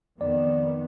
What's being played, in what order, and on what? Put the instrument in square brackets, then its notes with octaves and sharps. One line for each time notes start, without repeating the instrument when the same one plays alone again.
[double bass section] F2 D#3 B3 [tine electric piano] D5